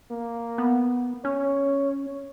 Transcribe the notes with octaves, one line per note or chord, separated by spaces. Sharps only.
A#3
B3
C#4 C#5